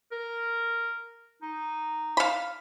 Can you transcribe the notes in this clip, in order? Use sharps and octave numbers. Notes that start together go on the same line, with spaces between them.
A#4
D#4
F5 B5